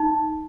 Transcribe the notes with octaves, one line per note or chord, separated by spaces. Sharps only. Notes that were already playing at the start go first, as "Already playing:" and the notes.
Already playing: D#4